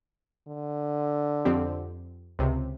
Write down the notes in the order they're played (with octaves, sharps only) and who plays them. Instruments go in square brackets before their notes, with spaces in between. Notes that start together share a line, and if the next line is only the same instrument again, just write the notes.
[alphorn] D3
[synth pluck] F2 C4 G4
C#2 C3